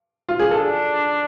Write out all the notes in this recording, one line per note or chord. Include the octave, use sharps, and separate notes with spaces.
F4
G#4
D4 A4